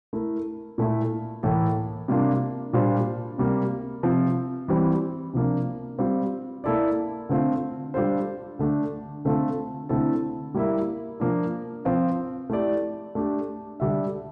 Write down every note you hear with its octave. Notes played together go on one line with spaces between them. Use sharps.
A3 E4 A#4
A#2 A3 E4
A2 E3 A#3 E4 A4
C3 G3 A#3 D4 F4
A#2 G3 D4 F4 C5
C3 G3 A#3
C3 F3 C4
E3 G3 C4
C3 F3 A#3 D4
G3 C4 F4
A#3 E4 A4 D5
D3 A3 C4 F4
G3 D4 F4 A4 C5
D3 A3 D4
D3 A3 C4 F4 A4
D3 A3 C4 E4 A4
G3 A#3 E4 A#4 E5
F3 A#3 D4
F3 C4 F4
A3 E4 G4 D5
A3 D4 G4
D3 G3 D4 A4 E5